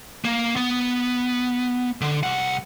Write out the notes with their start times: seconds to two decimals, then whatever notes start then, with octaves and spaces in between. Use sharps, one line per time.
0.24 A#3
0.56 B3
2.01 D3
2.23 C2 F#5